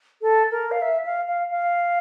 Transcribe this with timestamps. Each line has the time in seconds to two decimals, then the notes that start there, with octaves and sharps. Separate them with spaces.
0.22 A4
0.51 A#4
0.71 F5
0.82 E5
1.05 F5
1.28 F5
1.51 F5